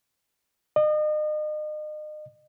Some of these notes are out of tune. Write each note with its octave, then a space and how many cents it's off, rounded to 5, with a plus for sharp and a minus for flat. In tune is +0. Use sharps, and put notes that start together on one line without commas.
D#5 -35